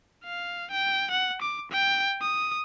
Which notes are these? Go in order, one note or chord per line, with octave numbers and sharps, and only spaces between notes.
F5
G5
F#5
D6
G5
D#6